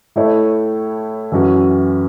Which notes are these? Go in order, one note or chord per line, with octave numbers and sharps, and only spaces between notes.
A2 A3 E4 C#5
F#2 E3 C#4 F#4